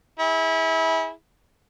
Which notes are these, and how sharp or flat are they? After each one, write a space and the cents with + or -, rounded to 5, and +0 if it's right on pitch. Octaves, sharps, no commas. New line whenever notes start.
E4 -25 G#4 -10